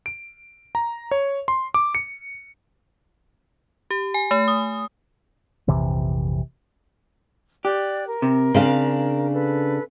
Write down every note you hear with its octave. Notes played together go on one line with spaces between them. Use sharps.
D7
A#5
C#5
C6
D6
C#7
G4
G#5
A3
D#6
A#1 F2 C3 E3
G4 D5 G5 F#6
A#4
C3
C#3 C4 D4 F5
A4 B4